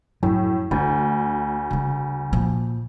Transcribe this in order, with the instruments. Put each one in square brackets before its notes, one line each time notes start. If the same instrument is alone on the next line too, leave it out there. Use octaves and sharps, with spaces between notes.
[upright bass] F#2 F3 [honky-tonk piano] A2 [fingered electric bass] F#3
[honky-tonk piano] D2 [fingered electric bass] D3 [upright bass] A3
[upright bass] C#3 G3
[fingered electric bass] A#2 [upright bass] F3